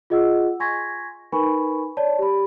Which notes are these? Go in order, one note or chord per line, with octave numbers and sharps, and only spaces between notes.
F4 G#4 D#5 F#5 E6
G#5 C6 C#6 G#6 A#6 B6
D#4 A#4 B4 G#5 B5 C#6
C#5 D5 A5
G4 B5